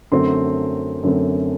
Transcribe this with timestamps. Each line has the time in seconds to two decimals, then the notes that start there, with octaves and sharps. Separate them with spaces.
0.12 F#2 D3 F#3 A3 C4 C6
1.03 F#2 D3 F#3 A3 C4